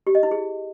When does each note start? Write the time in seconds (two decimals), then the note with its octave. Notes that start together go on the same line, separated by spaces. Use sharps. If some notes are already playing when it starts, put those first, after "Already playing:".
0.07 G4
0.15 D#5
0.23 E4
0.31 G#4